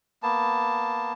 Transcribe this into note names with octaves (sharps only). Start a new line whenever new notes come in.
A#3 B3 A5